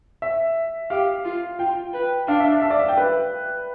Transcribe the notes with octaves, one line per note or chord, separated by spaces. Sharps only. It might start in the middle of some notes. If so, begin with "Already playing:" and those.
E5
G4 F5
F4
F4 G5
B4
D4 F5
E5
E5
D5
E5
G5
B4